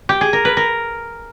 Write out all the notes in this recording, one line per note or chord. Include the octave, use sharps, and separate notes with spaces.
G4
G#4
A#4
B4
A#4